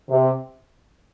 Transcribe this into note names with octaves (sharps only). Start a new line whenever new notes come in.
C3